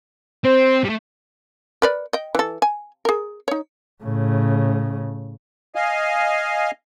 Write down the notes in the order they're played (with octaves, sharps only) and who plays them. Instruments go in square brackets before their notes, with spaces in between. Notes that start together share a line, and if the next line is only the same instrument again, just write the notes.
[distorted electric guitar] C4 [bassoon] C5
[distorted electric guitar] G3 A3
[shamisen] A#4 B4 D5
D#5 G5
E3 A4
G#5
G#4 A#4
D#4 C#5
[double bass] A2 C#3
[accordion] D#5 F5 G#5